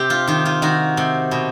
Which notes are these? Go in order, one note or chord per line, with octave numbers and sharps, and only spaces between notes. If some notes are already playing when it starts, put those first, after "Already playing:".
Already playing: C3 G4
F4
D#3 F4
F4
D#3 F#4
C3
B2